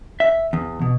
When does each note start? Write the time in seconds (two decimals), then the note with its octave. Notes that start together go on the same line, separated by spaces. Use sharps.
0.20 E5
0.53 E2
0.81 B2